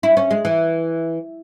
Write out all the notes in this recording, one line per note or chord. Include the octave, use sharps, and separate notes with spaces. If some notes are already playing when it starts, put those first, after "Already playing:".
E4
C#4
G#3
E3